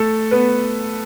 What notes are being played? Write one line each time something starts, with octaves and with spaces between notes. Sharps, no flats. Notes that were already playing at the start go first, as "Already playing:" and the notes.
Already playing: A3 A4
B3 B4